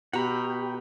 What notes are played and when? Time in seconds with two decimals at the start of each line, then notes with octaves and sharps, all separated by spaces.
0.13 B2 G4 F#5 A#5 B5